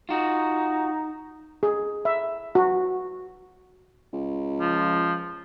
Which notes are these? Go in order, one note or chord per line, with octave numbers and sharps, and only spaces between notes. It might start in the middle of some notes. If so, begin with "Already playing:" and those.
D#4 F4 F#4
G#4
E5
F#4
C#2
F3